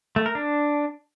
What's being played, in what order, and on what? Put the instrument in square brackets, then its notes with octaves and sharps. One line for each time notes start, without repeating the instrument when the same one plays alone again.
[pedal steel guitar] A3
A#4
D4